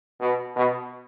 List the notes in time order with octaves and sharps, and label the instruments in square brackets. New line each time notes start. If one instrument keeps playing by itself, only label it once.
[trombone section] B2
B2